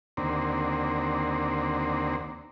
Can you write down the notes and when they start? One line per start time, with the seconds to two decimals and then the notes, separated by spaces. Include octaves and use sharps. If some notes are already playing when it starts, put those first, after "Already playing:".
0.17 D#2 D3 A#3 C4